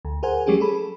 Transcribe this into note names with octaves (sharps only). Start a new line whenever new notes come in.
D2
G#4 A#4 C5 F#5 G#5
F#3 G3 A3 C#4 G4 G#4
G#4 A4 B5
A4